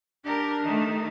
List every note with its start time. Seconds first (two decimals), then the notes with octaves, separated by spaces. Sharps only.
0.24 D4 G4 A#4
0.62 D#3 A3